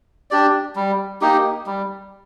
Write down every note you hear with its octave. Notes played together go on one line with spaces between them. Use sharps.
D4 G4 D5
G3
A#3 D#4 G4
G3